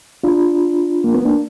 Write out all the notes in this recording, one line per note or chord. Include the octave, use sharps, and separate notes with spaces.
D4 F4
A#3
B3
A#3 D4